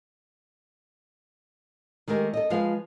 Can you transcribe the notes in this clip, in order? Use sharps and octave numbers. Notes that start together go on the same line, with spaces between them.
D#3 G#3 A3 G4 A#4
A4 D#5
F3 G#3 B4 F5